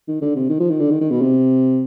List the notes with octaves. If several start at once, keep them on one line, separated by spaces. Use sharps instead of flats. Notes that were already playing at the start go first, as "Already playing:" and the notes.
D#3
D3
C3
D#3
F3
D#3
D3
D#3
D#3
B2
C3